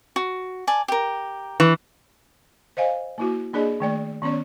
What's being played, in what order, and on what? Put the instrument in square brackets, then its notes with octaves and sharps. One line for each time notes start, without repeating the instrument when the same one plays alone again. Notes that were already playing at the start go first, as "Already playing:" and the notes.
[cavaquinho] F#4
D5 G#5 A5
G4 A#4
[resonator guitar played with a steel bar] E3 [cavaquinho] C#6
[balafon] C5 D#5 F5 G#5
A#3 E4 F#4
A#3 D4 G#4 D5 D#5
D#3 A3 D5
D#3 B3 C#4 C#5 D5